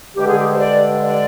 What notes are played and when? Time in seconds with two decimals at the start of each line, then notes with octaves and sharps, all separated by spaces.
0.15 G2 D3 G#3 G4
0.27 G#4
0.38 G4
0.52 C5
0.58 D5
1.00 D5